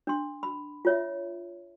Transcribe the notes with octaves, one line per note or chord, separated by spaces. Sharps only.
D4 C6
B5
F4 C#5 E5